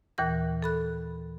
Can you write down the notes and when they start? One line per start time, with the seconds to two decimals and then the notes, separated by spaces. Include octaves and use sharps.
0.18 D#2 A#2 E3 A#4 A#6
0.62 A4 B5 F#6